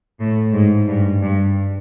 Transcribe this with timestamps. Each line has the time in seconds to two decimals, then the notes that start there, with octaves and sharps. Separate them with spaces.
0.20 A2
0.53 G#2
0.87 G2
1.21 G2